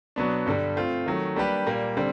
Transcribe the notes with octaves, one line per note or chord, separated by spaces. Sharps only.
B2 F#3 B3 D4
G2 D3 G3
A3 C4 F4
D#3 F#3 A3
G3 A#3 D4 G4 B4
A#2 G3 A#3
D3 G3 C4